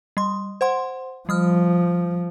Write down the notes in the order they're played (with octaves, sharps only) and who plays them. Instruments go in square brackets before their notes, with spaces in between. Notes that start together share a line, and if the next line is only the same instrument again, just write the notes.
[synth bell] G3 C6
C5 F#5 C6
[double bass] F3 [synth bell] G3 D#6 F6